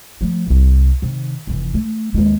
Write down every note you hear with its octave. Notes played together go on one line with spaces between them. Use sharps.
F3 A3
D#1 C2
C3 D#3
F1 E3
A3
D#2 G#3